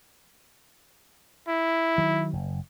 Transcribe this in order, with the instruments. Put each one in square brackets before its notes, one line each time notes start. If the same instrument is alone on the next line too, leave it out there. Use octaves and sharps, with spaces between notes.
[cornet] E4
[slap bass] D#3 F#3
F#1